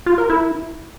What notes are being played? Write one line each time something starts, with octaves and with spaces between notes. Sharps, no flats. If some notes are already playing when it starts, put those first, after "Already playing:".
F4
A#4
E4